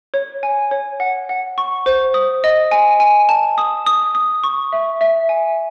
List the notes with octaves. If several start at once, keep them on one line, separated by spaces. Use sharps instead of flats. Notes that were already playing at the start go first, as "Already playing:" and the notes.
C#5
G#5
C#5
F#5
F#5
C#6
C5
D#6
D#5
G#5
G#5
A5
D#6
D#6
D#6
C#6
E5
E5
G#5